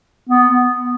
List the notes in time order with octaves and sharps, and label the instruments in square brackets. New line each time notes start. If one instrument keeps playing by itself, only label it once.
[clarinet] B3